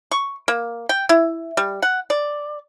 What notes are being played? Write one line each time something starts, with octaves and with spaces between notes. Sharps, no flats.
C#6
A#3
G5
E4
G3
F#5
D5